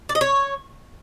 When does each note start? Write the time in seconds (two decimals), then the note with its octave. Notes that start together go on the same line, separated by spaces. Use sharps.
0.09 D5
0.15 D#5
0.21 C#5